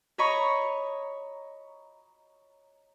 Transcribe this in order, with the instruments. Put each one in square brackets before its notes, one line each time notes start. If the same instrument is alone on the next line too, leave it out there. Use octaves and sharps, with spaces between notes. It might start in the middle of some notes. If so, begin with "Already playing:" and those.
[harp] C#5 D#5 A#5 B5 C#6